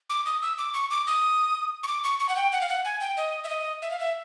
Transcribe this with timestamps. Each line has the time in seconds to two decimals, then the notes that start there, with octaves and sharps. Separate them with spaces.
0.10 D6
0.26 D#6
0.42 E6
0.58 D6
0.74 C#6
0.91 D6
1.07 D#6
1.83 C#6
1.88 D6
2.04 C#6
2.20 C#6
2.29 F#5
2.36 G5
2.52 F#5
2.61 F5
2.69 F#5
2.85 G#5
3.01 G5
3.17 D#5
3.44 E5
3.49 D#5
3.82 E5
3.91 F5
3.99 E5